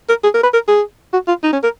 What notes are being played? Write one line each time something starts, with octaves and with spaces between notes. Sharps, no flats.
A#4
G#4
A#4
B4
A#4
G#4
F#4
F4
D#4
C#4
A#4